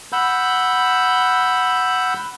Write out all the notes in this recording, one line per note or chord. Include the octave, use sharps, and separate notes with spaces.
F#5 B5 E6 G6